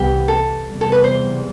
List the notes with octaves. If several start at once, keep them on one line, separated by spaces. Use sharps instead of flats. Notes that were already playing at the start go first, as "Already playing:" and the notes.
Already playing: C2 C3 E3 B3 G4
A4
E2 C3 E3 G3
A4
B4
C5